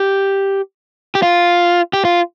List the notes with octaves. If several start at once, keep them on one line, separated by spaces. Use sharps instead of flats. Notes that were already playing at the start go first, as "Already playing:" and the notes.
Already playing: G4
G4
F4
G4
F4